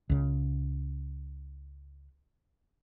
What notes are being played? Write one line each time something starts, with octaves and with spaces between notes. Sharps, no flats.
C#2 C#3